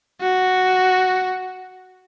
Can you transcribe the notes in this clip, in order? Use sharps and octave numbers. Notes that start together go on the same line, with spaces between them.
F#4